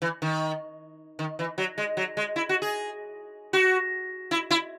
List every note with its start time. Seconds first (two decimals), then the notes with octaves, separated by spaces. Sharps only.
0.02 E3
0.22 D#3
1.19 D#3
1.39 E3
1.58 F#3
1.78 G#3
1.97 F#3
2.17 G#3
2.36 E4
2.49 F#4
2.62 G#4
3.53 F#4
4.31 E4
4.51 E4